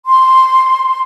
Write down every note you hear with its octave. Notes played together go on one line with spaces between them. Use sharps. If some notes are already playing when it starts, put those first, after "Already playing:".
C6